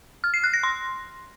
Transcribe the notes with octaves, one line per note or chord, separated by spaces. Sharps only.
F6
C7
F#6
A#6
C6